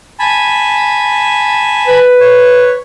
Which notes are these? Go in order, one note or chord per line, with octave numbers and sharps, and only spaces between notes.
G#5 A5 B5
B4
C#5